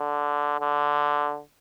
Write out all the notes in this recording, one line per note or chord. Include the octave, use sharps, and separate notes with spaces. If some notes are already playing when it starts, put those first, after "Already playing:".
Already playing: D3
D3